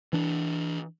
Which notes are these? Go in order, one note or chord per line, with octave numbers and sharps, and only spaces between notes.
E3 D4